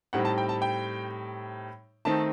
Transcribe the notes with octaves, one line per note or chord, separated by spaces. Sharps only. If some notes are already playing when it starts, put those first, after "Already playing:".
A2 G3 C4 D#4 F#5
A5
G5
A5
G5
D#3 A3 C4 D#4 A5